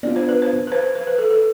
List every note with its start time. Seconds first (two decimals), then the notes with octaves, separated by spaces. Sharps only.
0.03 B3 D4 F4 D5
0.16 C5
0.29 B4
0.42 C5
0.67 B4
0.72 C5
0.84 C5
0.95 C5
1.07 B4
1.19 A4
1.30 A4